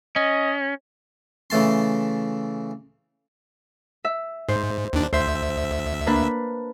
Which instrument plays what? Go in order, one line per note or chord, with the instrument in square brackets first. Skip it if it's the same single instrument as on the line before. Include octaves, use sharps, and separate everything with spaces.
[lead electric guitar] C#4 [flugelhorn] D#5
[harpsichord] C#3 E3 A3 A5 C6
[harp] E5
[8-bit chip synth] G#2 [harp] C5
[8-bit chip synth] D#2 D4
[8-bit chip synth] D2 E5 [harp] C5
[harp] A#3 D4 B4